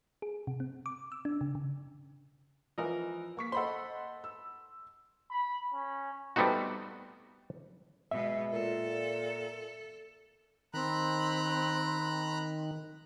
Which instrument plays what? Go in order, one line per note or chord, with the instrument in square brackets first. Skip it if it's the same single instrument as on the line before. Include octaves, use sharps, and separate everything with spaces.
[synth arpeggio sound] G#4
C3
C4
D6
E6
D4
C#3
C#3
[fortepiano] E3 A#4 D#5 [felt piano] F3
[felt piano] A#3 C#6 B6
[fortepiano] A4 B5 C6 [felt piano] C5 D#5 F#5
[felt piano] E6
[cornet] B5
C#4
[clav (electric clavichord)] G3 A3 B3 C4 D#4 F#4
[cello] B2 G#3 [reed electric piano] E5
[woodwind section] A#2 [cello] A4
[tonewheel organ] D#3 [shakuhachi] C4 [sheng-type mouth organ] A#5 B5 F#6